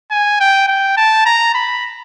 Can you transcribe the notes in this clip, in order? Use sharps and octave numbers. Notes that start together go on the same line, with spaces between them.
G#5
G5
G5
A5
A#5
B5